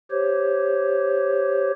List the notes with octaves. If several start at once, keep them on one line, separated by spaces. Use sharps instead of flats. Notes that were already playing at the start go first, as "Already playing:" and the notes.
G4 C5 C#5